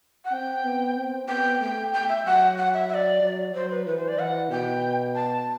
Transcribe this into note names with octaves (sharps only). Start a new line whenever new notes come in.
F#5
C4 G5
B3
C4
B3 G5
A3 G5
G5
E5
F#3 F#5
F#5
E5
E5
D5
F#3
F#3 C5
B4
E3 B4
C5
D5
E3 F#5
B2 G5
A5